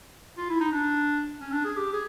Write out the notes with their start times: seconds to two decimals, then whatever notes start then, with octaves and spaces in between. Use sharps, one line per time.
0.37 F4
0.49 E4
0.60 D#4
0.72 D4
1.41 C#4
1.52 D4
1.64 G#4
1.76 G4
1.93 G#4